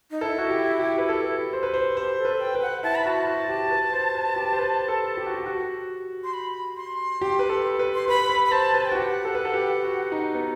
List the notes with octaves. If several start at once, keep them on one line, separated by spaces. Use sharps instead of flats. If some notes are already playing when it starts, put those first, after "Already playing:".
D#4
E4 A4
F#4
G4
G4
B4
A4
C5
B4
C5
G4 C5
A4
B4
G5
B4
F#5
E4 A5
B5
F#4 A5
F#4
G4
B4
C5
B4
G4
C5
B4
A4
G4
F#4
G4
F#4
C6
B5
C6
G4
B4
A4
B4
C6
B4 B5
B4
B5
C5 A5
B4
G5
F#4
G4 F#5
A4
B4
A4
G4
F#4
D#4
B3